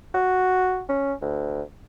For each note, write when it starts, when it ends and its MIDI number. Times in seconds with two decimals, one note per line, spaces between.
0.14 0.82 66
0.89 1.14 61
1.21 1.62 38